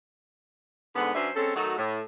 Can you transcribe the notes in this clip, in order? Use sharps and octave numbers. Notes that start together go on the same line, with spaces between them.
G#2 D3 B3
F#3 C#4 D4 B4 C5 E5
G#3 C4 C#4 A4
D#3 F#3 A3 D#4 F#4 A4
A2